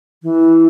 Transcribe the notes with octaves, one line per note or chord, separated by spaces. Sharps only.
E3